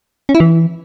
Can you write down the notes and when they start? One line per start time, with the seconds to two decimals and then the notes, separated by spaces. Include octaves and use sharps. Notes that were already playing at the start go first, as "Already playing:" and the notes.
0.29 C#4
0.35 E4
0.40 E3